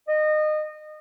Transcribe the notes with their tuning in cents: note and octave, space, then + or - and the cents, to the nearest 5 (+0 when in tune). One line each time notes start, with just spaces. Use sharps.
D#5 -25